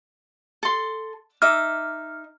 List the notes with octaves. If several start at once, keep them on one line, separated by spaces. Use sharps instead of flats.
A4 C6
D#4 E5 D6 F6